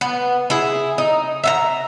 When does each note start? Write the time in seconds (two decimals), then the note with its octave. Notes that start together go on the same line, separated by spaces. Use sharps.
0.01 B3
0.50 E4 G#4
0.98 D#4
1.44 E5 F5 A#5